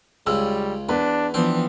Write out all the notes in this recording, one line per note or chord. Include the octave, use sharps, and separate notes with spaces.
C#2 C#3 G3 E6
E2 D4 B4
E3 F3 B3 C4 D4